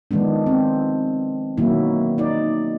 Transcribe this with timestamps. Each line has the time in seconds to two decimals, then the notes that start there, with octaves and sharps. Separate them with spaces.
0.11 D#3 F3 G#3 B3 D4
0.46 C4
1.57 B2 D#3 F#3 A#3 E4
2.18 D#4 D5